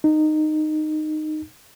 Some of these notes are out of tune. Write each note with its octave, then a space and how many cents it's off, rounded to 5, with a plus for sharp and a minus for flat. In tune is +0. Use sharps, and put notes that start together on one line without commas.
D#4 -15